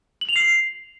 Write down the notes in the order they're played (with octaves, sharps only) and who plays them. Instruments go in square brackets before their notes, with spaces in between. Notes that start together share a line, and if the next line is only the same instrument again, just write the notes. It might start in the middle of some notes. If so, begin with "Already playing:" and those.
[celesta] F#7
F7
C7